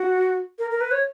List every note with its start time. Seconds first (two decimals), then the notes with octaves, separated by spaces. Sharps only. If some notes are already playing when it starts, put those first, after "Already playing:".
Already playing: F#4
0.59 A#4
0.71 A#4
0.81 B4
0.92 C#5